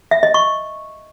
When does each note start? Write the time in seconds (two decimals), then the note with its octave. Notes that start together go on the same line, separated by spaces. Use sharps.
0.11 E5
0.23 D#5
0.34 C#6